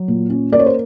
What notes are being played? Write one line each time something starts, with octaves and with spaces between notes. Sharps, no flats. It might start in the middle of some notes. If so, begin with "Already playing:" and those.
Already playing: F#3
A#2
C#4
A#3 D5
C#5
C5